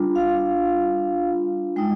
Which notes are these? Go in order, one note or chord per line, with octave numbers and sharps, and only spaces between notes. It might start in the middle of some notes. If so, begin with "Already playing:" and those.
Already playing: G3 D4 F4
F5
G#3 D#4 G5